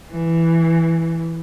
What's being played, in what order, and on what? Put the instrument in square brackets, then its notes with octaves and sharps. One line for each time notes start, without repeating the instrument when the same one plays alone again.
[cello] E3